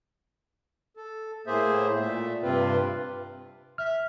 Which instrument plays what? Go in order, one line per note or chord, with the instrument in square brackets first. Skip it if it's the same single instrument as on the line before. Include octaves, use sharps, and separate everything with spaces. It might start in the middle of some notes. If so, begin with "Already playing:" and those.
[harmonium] A4
A2 A#3 G#4 C5 E5
A#2 A3 E5
G2 C3 C4 F4 B4
[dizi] E5 [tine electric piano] F6